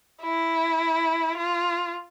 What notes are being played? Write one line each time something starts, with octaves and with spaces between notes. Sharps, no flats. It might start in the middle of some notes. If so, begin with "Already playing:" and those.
E4
F4